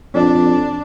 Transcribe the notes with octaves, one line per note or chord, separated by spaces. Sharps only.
F2 D4